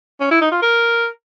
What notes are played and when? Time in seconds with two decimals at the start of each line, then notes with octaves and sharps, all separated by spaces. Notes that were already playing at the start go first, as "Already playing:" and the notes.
0.20 C#4
0.31 E4
0.41 D#4
0.52 F4
0.62 A#4